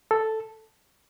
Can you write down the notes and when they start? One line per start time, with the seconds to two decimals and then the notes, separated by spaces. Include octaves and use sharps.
0.11 A4